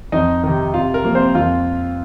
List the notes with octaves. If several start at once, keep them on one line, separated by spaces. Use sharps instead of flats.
F2 D#4 D#5
C3 D#3
C3 F4 F5
A#4
F3 A#3
C4 C5
F2 F4 F5